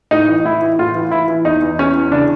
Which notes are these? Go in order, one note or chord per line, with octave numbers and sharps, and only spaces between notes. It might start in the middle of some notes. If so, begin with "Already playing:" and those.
A2 D#4
E3
A2 E4
E3
A2 F4
E3
E3 E4
E3
E2 D#4
E2
E2 C#4
E2
C#3 D4